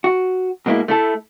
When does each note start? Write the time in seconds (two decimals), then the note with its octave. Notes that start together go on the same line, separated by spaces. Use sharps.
0.04 F#4
0.66 B2 G#3 A#3 E4
0.88 A3 E4 A4